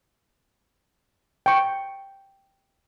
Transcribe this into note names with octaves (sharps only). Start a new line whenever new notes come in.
G5 C#6